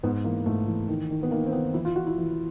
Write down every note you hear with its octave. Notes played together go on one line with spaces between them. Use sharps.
G#2 B3
E3 A#3
G#2 A3
E3
D#3
D#3
B3
D#3 A#3
C4
D#3 B3
E3 E4
F4
E3 F#4
E4
E3